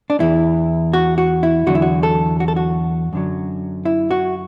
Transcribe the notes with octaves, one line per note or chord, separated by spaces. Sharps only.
D4
E2 E3 E4
F#4
F#4
E4
E2 D3 F#3 F#4
E4
F#4
A4
F#4
A4
F#4
F#2 D3 F#3
E4
F#4